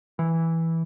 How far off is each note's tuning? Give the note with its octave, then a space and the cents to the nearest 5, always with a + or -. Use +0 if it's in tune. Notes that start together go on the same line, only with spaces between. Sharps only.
E3 -5